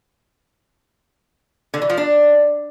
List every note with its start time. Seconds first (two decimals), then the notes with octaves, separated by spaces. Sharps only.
1.74 D3
1.82 E3
1.90 F3
1.98 D4